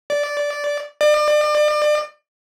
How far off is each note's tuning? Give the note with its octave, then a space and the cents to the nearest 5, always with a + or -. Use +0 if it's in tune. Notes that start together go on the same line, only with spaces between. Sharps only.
D5 -10
D5 +35